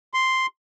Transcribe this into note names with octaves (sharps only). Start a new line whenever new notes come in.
C6